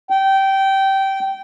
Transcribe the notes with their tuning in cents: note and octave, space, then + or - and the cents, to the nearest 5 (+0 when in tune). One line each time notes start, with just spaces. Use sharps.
G5 -15